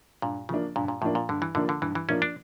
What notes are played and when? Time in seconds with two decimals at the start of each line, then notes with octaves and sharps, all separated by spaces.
0.22 G2 A#2
0.49 C#3 F3 A#3 D4
0.76 G2 A#2
0.88 A#2
1.02 A2 F3 A#3 D4
1.15 A#2
1.29 G2 D3
1.42 E3
1.55 D3 F3 A#3 D4
1.69 D3
1.82 G2 E3
1.95 E3
2.08 F3 A#3 C#4 D4
2.22 D4